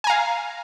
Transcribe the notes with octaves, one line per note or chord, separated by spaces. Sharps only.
F5 G#5 A#5